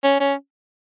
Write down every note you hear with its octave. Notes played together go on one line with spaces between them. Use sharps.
C#4
C#4